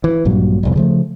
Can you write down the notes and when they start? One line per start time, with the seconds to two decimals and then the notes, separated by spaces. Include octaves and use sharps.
0.04 E3
0.25 A#1 G2 A#2 F#3
0.63 E1 C2 F2
0.76 C#3 F3 A3